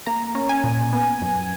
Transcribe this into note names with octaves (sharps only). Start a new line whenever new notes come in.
A#3 A#5
C#4
G#5
A#2
B3
F#2